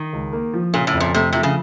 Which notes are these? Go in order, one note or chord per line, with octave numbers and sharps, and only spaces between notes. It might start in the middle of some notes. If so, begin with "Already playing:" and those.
Already playing: D#3
C#2
A#3
F3
A#2 C#3
A2
F2
A#2
C3 A3
C3 F3
C#3